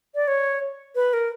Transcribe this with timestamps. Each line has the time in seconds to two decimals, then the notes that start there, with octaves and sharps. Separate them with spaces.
0.15 D5
0.28 C#5
0.95 B4
1.13 A#4